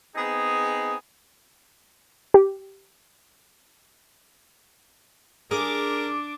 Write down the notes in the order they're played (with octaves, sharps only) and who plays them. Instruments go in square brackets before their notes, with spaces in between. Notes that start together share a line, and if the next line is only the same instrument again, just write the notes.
[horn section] B3 C4 D#4 G#4
[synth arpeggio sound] G4
[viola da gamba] D4 [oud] G#4 [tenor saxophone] A#4 [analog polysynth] D6